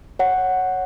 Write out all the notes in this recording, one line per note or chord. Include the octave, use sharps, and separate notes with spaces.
C#5 F#5